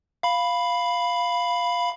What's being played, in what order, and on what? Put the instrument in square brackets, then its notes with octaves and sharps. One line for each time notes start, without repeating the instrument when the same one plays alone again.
[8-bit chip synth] F5 B5